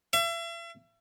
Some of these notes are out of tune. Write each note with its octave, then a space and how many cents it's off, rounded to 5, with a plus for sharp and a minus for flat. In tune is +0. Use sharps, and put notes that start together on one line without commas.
E5 +40